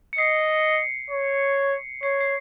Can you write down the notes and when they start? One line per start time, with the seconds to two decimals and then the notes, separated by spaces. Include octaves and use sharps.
0.13 C#7
0.18 D#5 C7
1.10 C#5
2.03 C#5 C7
2.21 C7